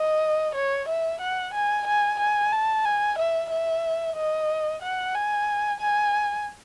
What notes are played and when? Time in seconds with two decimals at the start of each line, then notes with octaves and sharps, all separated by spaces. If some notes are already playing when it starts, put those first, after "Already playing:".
Already playing: D#5
0.55 C#5
0.89 E5
1.21 F#5
1.54 G#5
1.87 G#5
2.20 G#5
2.52 A5
2.85 G#5
3.18 E5
3.51 E5
4.17 D#5
4.82 F#5
5.14 G#5
5.80 G#5